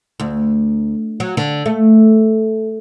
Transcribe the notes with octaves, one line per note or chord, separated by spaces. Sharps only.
D2
F#3
D3
A3